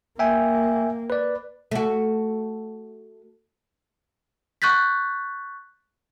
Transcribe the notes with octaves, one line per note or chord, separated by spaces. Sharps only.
A#3 E5 G5 G#5
B4 D5
A3 F#4
C#6 F#6 G6 A6 B6